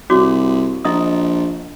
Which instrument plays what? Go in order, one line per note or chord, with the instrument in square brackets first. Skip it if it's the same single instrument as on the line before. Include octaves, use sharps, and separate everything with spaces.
[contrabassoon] C2 [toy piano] F#4 C#5 D6
[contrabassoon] A#1 [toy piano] E4 D#5 D#6